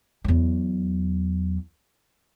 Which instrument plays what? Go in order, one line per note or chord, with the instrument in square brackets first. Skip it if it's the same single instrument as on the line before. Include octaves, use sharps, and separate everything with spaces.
[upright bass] E2 F#3